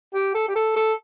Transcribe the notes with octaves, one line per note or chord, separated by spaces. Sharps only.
G4
A4
G4
A4
A4